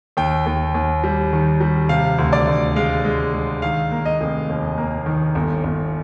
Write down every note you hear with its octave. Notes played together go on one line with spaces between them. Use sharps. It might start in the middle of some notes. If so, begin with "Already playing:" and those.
D#2 G5
D#2
D#2
G3
D#3
G3
C3 F5
D2
D5
D2
G#3 F5
G#3
G#3
D#3 F5
A#3
D#5
F1
D#2
A#3
D#3
G1
G1